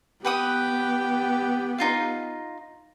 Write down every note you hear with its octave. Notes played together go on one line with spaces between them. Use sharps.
B3 G4 B4 F#5 D#6
D#4 F4 F5